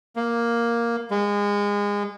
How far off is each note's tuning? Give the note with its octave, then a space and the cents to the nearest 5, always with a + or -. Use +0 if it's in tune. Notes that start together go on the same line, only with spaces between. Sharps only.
A#3 +5
G#3 -25